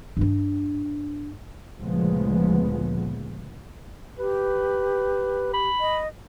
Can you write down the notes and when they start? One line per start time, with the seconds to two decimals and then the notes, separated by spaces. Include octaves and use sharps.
0.17 G2 D4
1.82 D2 A#2 C#3 F3 G#3 B3
4.19 G4 B4
5.54 B5
5.80 D#5